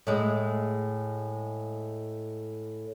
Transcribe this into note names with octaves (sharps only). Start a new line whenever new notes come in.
A2 G#3